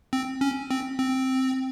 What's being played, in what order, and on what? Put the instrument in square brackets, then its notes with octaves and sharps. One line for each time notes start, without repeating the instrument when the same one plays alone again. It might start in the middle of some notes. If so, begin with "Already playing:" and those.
[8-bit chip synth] C4
C#4
C4
C4